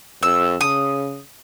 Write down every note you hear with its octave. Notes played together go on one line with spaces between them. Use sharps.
F2 E6
C#3 D#6